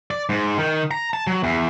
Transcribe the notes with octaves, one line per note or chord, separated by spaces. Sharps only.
D5
G#2
D#3
A#5
A5
F#3
E2